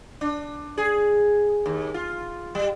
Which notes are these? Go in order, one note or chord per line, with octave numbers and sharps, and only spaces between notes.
D4
G#4
D#2
F4
G3